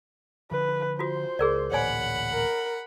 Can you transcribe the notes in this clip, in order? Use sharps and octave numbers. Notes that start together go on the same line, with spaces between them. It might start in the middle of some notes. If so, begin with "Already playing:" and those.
D3 F3 B4
F4 F#4 C5
C#2 G#4 A#4 D5
A1 D2 A#2 C#5 D5 F#5 G#5 B5
A#4